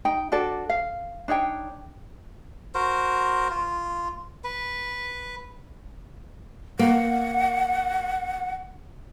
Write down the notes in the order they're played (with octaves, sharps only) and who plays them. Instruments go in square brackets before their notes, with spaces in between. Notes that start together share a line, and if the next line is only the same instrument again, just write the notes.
[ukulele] D#4 G5
D4 F#4 A4 D5
F5
D4 D#4 C#5 G5
[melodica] F#4 A#4 C5
F4
B4
[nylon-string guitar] A#3 [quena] F#5